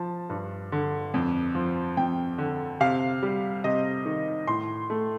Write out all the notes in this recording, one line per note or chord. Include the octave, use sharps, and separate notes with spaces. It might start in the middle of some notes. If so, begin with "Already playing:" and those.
Already playing: F3 A5
G2
D3
F2
F3
F2 G5
D3
C3 F5
G3
C3 D#5
D#3
A2 C6
A3